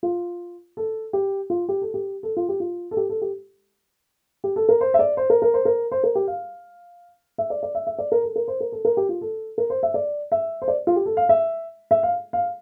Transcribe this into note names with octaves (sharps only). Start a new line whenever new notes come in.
F4
A4
G4
F4
G4
A4
G4
A4
F4
G4
F4
A4
G4
A4
G4
G4
A4
A#4
C5
E5
D5
C5
A#4
A#4
C5
A#4
C5
A#4
G4
F5
E5
D5
D5
E5
E5
D5
A#4
A4
A#4
C5
A#4
A4
A#4
G4
F4
A4
A#4
C5
E5
D5
E5
C5
D5
F4
G4
A4
F5
E5
E5
F5
F5